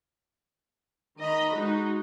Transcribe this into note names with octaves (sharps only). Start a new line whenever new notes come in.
D#3 D#5 A#5 B5
G#3 D#4 F#4